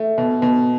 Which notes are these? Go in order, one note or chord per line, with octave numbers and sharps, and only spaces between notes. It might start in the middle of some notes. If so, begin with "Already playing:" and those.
Already playing: A3
B2
B2